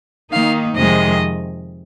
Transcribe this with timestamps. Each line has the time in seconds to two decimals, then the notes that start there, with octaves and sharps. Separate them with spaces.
0.32 D#3 A#3 D#4 F5
0.76 F2 C3 D#3 G#3 D#5